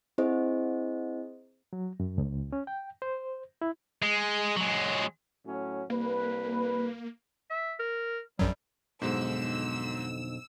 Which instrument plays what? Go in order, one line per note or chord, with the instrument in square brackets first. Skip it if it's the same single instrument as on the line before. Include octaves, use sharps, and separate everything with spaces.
[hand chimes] C4 E4 G#4 C5 D#5
[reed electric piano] F#3
F#2
C#2
C#4
G5
C5
E4
[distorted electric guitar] G#3
F#3 G#3
[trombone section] A2 F#3 C#4
[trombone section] C2 B4 [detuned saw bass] A#3
[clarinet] E5
A#4
[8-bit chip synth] A#1 F#2 F#3 [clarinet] G3
[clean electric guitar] B1 [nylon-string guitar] F2 B2 D3 [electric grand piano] G#2 G#3 [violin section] E6